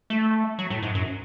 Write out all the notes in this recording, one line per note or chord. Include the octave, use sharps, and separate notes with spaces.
A3
F#3
A2
G#2
F#2